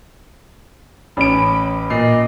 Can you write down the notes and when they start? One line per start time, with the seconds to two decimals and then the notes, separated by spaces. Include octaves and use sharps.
1.17 A1 C#4 B5 D7
1.90 A#2 D#5 C7